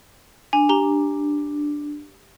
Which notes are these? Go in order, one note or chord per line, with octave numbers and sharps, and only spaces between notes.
D4 G#5
G4 A#5 G7